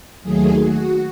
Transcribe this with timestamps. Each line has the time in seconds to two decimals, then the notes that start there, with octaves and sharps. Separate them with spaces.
0.22 D#2 D#3 F#3 A3 G#4
0.62 F#4